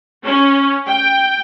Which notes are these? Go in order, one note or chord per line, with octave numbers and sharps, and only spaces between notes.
C#4
G5